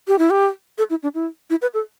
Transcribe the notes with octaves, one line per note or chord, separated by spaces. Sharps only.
G4
E4
G4
A4
E4
D4
E4
E4
B4
A4